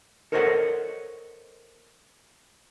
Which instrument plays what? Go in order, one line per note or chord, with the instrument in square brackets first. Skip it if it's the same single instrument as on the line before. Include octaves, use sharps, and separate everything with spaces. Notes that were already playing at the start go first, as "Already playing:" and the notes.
[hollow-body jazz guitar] A4 A#4 C5 C#5 D#5 F#5